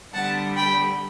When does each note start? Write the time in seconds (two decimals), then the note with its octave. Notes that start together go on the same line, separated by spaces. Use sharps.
0.13 D3 G3 B3 F#5 A5
0.56 G5 B5